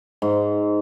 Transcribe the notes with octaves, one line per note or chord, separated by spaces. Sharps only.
G#2